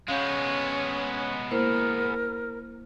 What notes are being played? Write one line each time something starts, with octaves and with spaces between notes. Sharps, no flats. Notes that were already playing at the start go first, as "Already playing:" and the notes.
G#3 B3 C#4 F5 G6
A#3 E4 A#4 C5